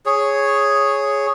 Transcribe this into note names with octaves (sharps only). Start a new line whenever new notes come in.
G#4 C#5